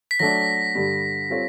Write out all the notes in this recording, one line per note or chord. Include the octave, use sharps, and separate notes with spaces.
B6
F#3 A3 D4 A#6
G2 D3 G3
G3 C4 F4 A4 C#5